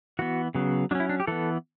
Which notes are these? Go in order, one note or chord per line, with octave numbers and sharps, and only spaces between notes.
E3 B3 F#4
C#3 F#3 B3
F#3 C#4 D4 E4
D4
G4
E3 B3 A4